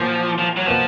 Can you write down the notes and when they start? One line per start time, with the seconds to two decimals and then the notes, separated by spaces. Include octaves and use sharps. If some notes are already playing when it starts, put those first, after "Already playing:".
Already playing: A#2 F3 F#3 A#3 F4
0.38 F3
0.57 F#3
0.66 B2 F3 A#3 F4